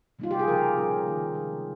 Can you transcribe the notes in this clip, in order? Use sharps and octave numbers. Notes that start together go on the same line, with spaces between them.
C3 G3 A#3 D#4 F4
G4
G#4
C#3 F3 A#3 A#4
A#2 G3 C#4 F4
D#3 A#3 D#4
C3 D#3 G#3